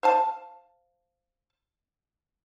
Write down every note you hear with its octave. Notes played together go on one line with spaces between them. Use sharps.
C5 F5 A5